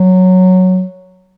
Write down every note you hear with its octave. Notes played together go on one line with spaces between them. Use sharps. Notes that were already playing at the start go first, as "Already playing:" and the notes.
Already playing: F#3